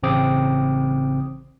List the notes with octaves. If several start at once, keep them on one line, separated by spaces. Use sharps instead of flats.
A1 C#3 C4 D6 D#6